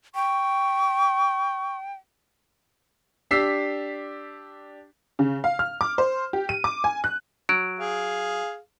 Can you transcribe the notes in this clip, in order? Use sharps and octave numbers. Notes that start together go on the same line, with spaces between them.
G5 C#6
D4 G4 E6 B6 C7
C#3
F5
F6
D6
C5
G4
D#7
D6
G#5
F#6
F#3 D7
G#4 F5